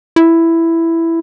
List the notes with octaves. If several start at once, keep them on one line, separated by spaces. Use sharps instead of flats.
E4